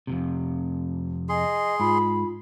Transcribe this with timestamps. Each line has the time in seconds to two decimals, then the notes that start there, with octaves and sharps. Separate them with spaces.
0.07 F2 A2 C3
1.29 G#4 D#5 C6
1.80 G#2 F4 B5